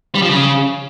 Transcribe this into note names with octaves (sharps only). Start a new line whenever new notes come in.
G3
F3
C#3